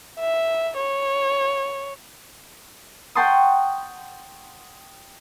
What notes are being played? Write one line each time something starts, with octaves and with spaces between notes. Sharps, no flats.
E5
C#5
F#5 G5 A5 C6 C#6 D#6